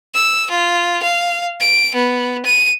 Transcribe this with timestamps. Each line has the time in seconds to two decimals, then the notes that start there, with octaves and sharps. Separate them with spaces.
0.14 E6
0.50 F4
1.03 F5
1.60 D7
1.95 B3
2.45 D#7